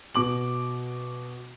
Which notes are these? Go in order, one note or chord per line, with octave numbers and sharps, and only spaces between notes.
B2 D6 F#7